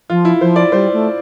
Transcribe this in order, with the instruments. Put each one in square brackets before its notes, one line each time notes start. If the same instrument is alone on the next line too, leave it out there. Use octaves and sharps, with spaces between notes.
[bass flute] F3 [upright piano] F4
[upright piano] E4
[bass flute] F3 [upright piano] C5
[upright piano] D5
[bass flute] G3 [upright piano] C5
[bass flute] A3